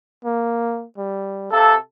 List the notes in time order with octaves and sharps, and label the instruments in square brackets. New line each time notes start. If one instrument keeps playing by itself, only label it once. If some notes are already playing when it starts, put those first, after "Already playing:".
[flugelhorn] A#3
G3
[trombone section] C3 A4 [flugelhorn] F5